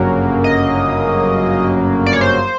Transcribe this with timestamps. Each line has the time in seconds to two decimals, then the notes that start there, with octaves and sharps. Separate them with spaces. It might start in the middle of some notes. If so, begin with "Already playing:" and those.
Already playing: G1 F#2 C#3 F#3 A#3
0.44 D#5
2.06 D5
2.13 C#5
2.21 C5